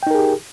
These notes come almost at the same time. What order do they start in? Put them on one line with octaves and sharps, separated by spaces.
G5 D#4 A#4 G#4 G4